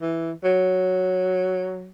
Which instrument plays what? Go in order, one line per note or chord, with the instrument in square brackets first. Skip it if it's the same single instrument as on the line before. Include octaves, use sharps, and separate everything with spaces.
[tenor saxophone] E3
F#3